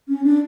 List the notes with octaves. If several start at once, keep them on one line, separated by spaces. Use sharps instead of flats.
C#4
D4